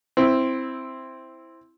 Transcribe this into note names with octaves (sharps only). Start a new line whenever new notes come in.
C4 E4